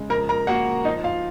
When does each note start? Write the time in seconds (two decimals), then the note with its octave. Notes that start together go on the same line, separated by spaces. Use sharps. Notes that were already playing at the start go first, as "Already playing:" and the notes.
Already playing: C#3 G#3
0.09 F3 A#4 A#5
0.29 A#4 A#5
0.47 A#3 F#4 F#5
0.85 F3 D#4 D#5
1.04 F4 F5